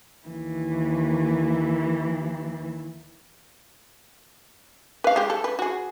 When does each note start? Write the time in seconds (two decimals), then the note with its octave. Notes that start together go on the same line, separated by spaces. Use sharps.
0.27 D#2 E3
5.04 B4 F5
5.16 G#3 G4
5.30 A4
5.44 B4
5.59 F#4 G#4